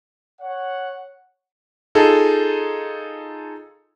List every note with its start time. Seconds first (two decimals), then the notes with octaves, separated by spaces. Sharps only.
0.42 C#5 F#5
1.95 D#4 F4 G#4 A4